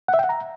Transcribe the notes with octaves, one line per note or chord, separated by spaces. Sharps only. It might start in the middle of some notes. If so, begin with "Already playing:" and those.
F#5
E5
G5
F#5
A#5